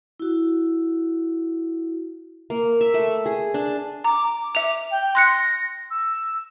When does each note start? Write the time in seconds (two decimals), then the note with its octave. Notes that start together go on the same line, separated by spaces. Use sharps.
0.20 E4 F#4
2.50 A#3
2.81 E5
2.94 A3
3.26 G#4
3.54 D4
4.04 A#5 D6
4.55 E5 F7
4.91 G5
5.15 C6 F#6 A#6 C#7
5.91 E6